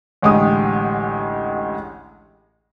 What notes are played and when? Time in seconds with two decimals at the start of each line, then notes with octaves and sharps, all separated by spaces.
0.22 A1 D2 G#3 G4 D#6